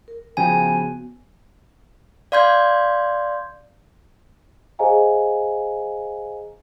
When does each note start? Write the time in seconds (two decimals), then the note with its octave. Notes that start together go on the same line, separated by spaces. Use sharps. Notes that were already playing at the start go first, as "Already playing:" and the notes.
0.08 A#4
0.37 C#3 F3 B3 F#4 G5 G#5
2.32 D5 F5 C6 G6 G#6
4.79 G#4 C5 D#5 F5 G#5 A#5